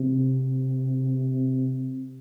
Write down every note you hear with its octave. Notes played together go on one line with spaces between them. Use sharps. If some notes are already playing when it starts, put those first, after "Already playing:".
Already playing: C3